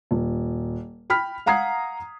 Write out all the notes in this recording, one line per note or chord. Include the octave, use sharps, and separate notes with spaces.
D#1
G5 B5 F6 B6
F5 F#5 A#5 D#6 G#6 C7